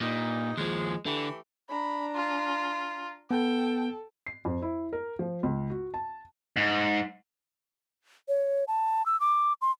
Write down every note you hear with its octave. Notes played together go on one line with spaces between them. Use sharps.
G2 A#2 D#4
D#2 F3 G#3
D3 E3 A3 G4
D4 A#5 B5
F4
B3 A4 G5 A5
C7
F2
E4
A#4
F3
C#2
F#4
A5
G#2
C#5
A5
E6
D6
C6